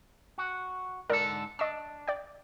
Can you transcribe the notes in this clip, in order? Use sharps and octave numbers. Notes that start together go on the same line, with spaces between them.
F#4
G#2 D3 A4 A#4 D5
D4 D#5 C#6 E6
D5 G5